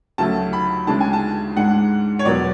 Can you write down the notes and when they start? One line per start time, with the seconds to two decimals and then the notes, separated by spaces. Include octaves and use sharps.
0.18 D2 C#3 F#3 A3 A5
0.53 B5
0.87 D2 C#3 G#3 D4 A5
1.00 G#5
1.13 A5
1.56 G#2 G#3 D4 F#5
2.19 C#5
2.25 E2 B2 F#3 B3 D5